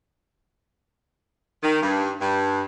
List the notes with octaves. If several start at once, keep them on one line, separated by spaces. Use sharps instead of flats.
D#3
G2
G2